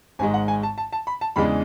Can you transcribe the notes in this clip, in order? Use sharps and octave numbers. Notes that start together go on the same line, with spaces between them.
G#1 G#2 G#3 G#5
F#5
G#5
A5
A5
A5
B5
A5
E2 C#3 E3 G#3 D4 B5